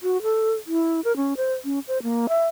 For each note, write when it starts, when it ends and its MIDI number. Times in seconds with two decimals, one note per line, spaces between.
0.03 0.21 66
0.22 0.53 69
0.67 1.00 64
1.04 1.15 70
1.16 1.34 61
1.37 1.54 72
1.65 1.79 61
1.88 2.02 72
2.03 2.27 58
2.29 2.46 76